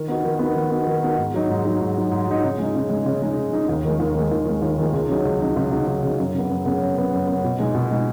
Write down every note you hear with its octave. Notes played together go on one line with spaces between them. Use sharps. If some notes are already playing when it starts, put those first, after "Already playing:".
Already playing: D#3
B3 D#4 F#4
D#3
B3 D#4 F#4
D#3
B3 D#4 F#4
D#3
B3 D#4 F#4
G#2
F#3 D#4
G#2
F#3 D#4
G#2
F#3 D#4
G#2
F#3 D#4
C#3
G#3
D#4
C#3
G#3 D#4
C#3
G#3 D#4
C#3
G#3 D#4
D#2
D#3 G#3
D#2
D#3 G#3
D#2
D#3 G#3
D#2
D#3 G#3
C#2
C#3 F#3 D#4
C#2
C#3 F#3 D#4
C#2
C#3 F#3 D#4
C#2
C#3 F#3 D#4
F#2
C#3 B3
F#2
C#3 B3
F#2
C#3 B3
F#2
C#3 B3
B2
G#3 D#4 G#4
B2
G#3 D#4 G#4